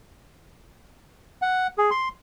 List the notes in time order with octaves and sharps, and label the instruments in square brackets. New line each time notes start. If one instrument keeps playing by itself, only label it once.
[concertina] F#5
G#4
C6